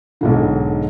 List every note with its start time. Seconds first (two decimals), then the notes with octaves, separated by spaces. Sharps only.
0.21 B1 G#2 D3